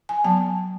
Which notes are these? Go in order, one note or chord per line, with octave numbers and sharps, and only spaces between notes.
G#5
F#3 B3 A5